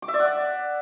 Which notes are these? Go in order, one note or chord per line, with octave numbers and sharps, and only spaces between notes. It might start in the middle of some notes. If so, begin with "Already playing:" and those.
D6
E5
D5
F#5